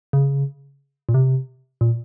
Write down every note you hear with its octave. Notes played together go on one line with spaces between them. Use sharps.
C#3
A#2
C3
A#2